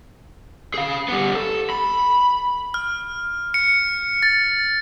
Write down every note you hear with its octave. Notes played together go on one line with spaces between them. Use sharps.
G#4 F5
G3 B3
A4
B5
F6
C#7
A6